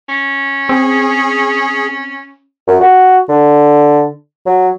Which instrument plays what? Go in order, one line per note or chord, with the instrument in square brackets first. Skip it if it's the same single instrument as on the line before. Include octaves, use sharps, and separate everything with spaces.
[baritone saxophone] C#4
[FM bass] C4 [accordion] G#4
[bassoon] F#2
F#4
D3
F#3